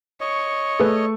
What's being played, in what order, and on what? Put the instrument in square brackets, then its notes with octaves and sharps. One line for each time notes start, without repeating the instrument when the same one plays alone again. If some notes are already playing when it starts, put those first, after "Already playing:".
[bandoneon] C#5 D#5 [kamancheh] C#6
[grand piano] A3 [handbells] G#4 B4